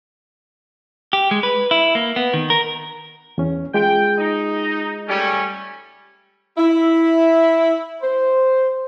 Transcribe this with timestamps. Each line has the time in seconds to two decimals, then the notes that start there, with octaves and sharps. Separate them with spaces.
1.13 G4
1.31 G#3
1.43 B4
1.71 E4
1.95 A#3
2.16 B3
2.34 D#3
2.50 A#4
3.38 E2 C#4
3.74 G#3 F4 G#4 G5
4.18 D#4
5.08 G3 A3 C#4
6.58 E4
8.03 C5